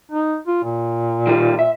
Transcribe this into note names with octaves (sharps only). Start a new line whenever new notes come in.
D#4
F4
A#2
D#3 G3 F4
E5